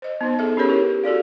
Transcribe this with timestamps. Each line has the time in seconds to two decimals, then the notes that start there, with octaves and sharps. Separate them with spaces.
0.02 C5 D#5
0.21 B3 D#4 C5
0.39 B3 G#4 A4 E5
0.57 C#4 G4 G#4 A#4 C#5
0.69 E4 G4 B4
1.03 F#4 A4 D5 F5